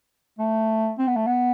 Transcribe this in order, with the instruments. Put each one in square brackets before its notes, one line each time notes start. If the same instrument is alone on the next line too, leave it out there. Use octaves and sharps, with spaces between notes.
[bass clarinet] A3
C4
B3
A3
B3